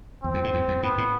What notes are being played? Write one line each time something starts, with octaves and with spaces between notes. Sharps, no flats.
E2 C4
F2
G#2
E2
F2
G#2 B3
A2